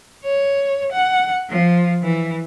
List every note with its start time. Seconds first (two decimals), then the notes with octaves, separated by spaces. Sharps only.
0.24 C#5
0.92 F#5
1.50 F3
2.03 E3